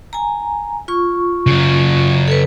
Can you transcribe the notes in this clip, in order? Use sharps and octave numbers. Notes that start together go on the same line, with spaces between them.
G#5 A#5
F4 C#6
C#3 F#3
A4 B4